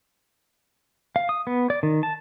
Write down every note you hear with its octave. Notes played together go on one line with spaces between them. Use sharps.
F5
D#6
B3
D5
D#3
A5